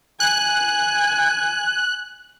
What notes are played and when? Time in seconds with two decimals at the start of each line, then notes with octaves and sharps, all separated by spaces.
0.20 G#5 F#6